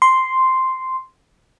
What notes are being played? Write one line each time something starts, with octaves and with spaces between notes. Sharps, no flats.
C6